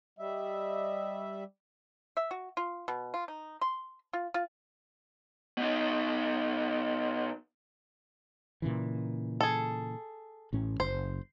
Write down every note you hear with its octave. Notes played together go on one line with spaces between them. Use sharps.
G3 D#5 E5
E5
F#4
F4
B2
F4
D#4
C6
F4
F4
B2 D#4
A#2 C#3 E3
G#4 A4
A1 A2 C#4
F#1 C5